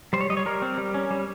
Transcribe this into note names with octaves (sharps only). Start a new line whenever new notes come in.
G3 C5
C#5
G3 D#5
C#5
G3 A#4
C4
G3
C#4
G3